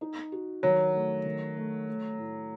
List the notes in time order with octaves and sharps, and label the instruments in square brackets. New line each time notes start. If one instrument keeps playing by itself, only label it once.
[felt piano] D#4
F#4
[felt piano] D#3 [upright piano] F#3
[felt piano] A3
D#3
A3
A3
A2